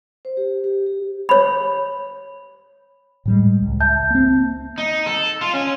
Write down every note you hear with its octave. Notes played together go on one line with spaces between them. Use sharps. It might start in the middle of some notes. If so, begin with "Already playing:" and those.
C5
G4
G4
G4
C#5 B5
A2 G3 G#3
C#2
E5 A5 G6
A#3 C4
D#4
A4
F4
C#4